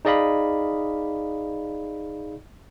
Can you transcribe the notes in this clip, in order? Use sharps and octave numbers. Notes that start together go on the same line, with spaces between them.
D#4 G#4 D5 D#5 F5 B5